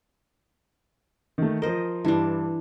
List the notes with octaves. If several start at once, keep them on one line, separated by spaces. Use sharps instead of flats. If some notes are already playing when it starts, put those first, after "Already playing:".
D#3 A3
F3 A#4 C5 D#5
G2 E3 D4